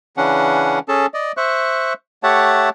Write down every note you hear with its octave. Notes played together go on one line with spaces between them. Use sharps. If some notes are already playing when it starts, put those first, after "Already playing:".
C#3 E3 C#4 D4 F#5
C#4 G#4 A4 A5
D5 D#5
C5 E5 C#6 F#6
A3 G4 C#5 E5 F#5 A5